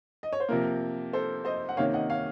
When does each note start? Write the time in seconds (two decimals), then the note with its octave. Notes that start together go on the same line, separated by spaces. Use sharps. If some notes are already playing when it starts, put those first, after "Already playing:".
0.23 D#5
0.33 C#5
0.40 C5
0.48 C3 F3 A#3 A#4
1.13 A4 C5
1.45 C5 D#5
1.69 F#5
1.77 C3 D#3 A#3 C#4 C#5 F5
1.94 D#5 F#5
2.10 C#5 F5